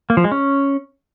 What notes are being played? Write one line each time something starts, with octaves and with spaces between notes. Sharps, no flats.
A#3
F3
G#3
C#4